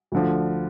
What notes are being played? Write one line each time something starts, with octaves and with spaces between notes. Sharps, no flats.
D2 D3 F3